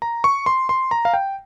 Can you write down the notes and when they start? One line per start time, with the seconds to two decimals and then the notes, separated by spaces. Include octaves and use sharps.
0.02 A#5
0.24 C#6
0.46 C6
0.69 C6
0.91 A#5
1.05 F5
1.14 G5